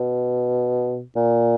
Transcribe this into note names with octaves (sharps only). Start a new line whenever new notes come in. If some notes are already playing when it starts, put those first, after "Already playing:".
Already playing: B2
A#2